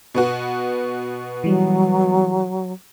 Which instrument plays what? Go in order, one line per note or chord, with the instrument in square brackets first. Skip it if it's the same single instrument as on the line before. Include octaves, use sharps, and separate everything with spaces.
[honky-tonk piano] B2 B3 F#4
[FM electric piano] E3 G3 [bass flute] F#3